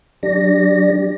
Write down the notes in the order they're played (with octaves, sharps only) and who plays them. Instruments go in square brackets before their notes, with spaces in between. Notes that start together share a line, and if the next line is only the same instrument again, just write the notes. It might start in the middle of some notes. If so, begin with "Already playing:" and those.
[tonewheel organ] F#3 D4 G4 D5 A#6